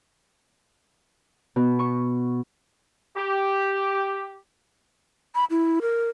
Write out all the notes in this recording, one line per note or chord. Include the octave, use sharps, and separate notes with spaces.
B2
C#6
G4
B5
E4
A#4